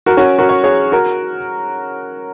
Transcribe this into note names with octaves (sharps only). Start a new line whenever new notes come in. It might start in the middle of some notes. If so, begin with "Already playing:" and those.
F#4 A#4
C#4 F#4
F#4 A#4
C#5
G#4 C#5
F#4 A#4